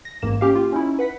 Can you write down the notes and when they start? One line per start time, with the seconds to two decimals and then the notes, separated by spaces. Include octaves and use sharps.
0.05 A#6
0.22 A1 G#2 A#3 E7
0.41 A#3 C#4 G4 F5
0.55 F4
0.72 C#4 D#4 E4
0.99 B4 F#5 B6